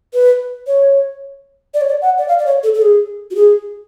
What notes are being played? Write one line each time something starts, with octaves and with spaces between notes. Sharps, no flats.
B4
C#5
D5
C#5
D5
F#5
D5
F5
D5
C#5
A4
A4
G#4
F#4
G#4